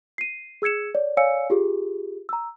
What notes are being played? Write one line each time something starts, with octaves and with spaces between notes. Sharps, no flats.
C7 D#7
G#4 E6 G#6 C#7 E7
C#5 D5
C#5 D5 F5 G#5 E6 C#7
F4 G4 G#4
A#5 E6